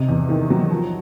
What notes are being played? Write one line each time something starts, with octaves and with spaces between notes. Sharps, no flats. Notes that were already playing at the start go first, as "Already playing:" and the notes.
Already playing: C3 D#4
E2
D#3
F#3
F3